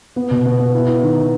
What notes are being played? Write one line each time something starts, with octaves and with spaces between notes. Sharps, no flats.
B3
B2
B3
B3
E4
E4
D#3